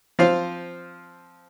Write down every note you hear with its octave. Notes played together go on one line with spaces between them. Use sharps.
F3 C4 F4 F5